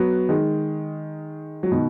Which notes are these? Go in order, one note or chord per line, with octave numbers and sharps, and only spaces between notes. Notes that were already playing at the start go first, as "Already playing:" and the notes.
Already playing: F#3 B3
D#3 G#3
F#3
B2 D#3